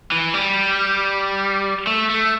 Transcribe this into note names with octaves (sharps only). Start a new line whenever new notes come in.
E3
G3
A3
A3